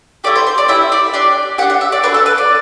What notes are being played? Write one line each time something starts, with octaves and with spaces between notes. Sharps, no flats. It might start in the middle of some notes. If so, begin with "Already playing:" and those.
A3 E4 G4 D5
C5
C5
D5
A3 E4 G4 E5
D5
D4 G4 D5
D4 G4 F#5
F#5
E5
D5
D4 F#4 A4 B4
A4
B4
D5